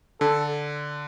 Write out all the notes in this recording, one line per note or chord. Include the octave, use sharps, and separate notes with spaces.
D3 A4